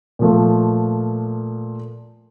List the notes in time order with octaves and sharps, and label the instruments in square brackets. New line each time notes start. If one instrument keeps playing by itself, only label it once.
[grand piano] A#2 F3 A3